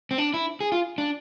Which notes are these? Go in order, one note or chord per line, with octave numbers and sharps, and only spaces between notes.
C4
D4
E4
G#4
F4
D4